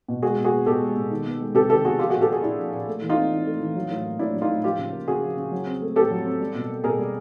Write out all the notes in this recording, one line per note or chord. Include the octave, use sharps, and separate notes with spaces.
B2
G#3 F#4 G#4
B2
F#4 G#4
B3
B2 G4 A4
G#3
B2
D#3
B3
G#3
C3 G4 A4
D#3 G4 A4
B3 F#4 G#4
F3 F4 G4
F#4 G#4
A#2
G4 A4
A#3 F#4 G#4
A#2 D4 E4
F3
A#2
A3
E3
D#4 F4
C4
E3
A3
E3
F#3
A2
A#3
A2 D4 E4
F#3
D#4 F4
A2
F3 F4 G4
C#3
A#3
C#3 F#4 G#4
F3
C#3
F#3
C4
A3
A2 G4 A4
F#3
C4
G3
B2
A#3
B2 G#4 A#4
G3